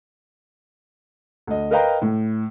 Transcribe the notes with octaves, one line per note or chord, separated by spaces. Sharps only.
D2 D#5
A#4 B4 D#5 F5 G5 A#5
A2